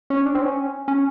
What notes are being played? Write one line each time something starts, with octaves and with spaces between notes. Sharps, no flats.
C#4
D4
C4
C#4
C#4